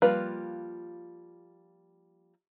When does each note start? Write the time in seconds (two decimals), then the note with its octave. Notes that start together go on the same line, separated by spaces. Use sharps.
0.02 F3 G3 A#3 F4 B4